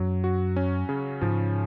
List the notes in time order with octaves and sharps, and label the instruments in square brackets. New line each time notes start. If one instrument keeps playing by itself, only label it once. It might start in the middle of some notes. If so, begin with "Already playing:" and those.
Already playing: [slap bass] F#2 [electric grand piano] F#3
[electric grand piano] F#4
C#4
C#3
[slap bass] G#2 [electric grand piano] F3